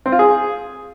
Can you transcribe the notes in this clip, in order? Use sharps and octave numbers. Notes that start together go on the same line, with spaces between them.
C4
F4
G#4